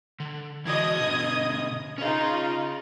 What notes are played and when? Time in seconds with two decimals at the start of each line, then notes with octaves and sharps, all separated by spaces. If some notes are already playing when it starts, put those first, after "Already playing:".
0.20 D3
0.65 E3 E4 F#4 D#5 D#6 G#6
1.00 B2 D3
1.98 C#4 D#4 F4 G#4 D#5